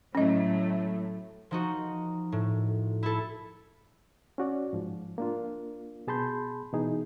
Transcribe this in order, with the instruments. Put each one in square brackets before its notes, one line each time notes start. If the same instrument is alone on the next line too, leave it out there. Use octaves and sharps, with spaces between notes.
[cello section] A2 F#3 A3 [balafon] C#4 D#5
[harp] F3 D#4 F#4
A2
E4 A4
[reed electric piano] C#4 F#4 D5
G#2 F3
A#3 D4 F4
B2 G#4 A5 B5 C6 G6
B2 E3 D#4 G#4